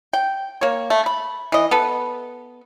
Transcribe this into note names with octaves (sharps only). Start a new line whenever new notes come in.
G5
A#3 C#5
A3
B5
E3 D#5
B3 A4 B4